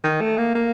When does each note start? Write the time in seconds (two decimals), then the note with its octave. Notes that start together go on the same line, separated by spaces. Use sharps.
0.04 D#3
0.21 A3
0.37 A#3
0.55 A#3